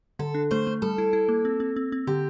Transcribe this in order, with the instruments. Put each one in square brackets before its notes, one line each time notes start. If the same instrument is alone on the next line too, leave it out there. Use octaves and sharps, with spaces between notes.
[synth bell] D3 [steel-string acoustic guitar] A4
[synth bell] D4
[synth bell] A3 [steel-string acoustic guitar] C5
[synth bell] A3
[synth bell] G3 [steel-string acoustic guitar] A4
[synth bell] E4
E4
A#3
C4
C4
C4
C4
[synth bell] D3 [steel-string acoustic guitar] G4